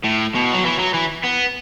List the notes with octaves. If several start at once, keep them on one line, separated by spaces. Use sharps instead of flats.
A2
B2
F#3
E3
F#3
E3
B3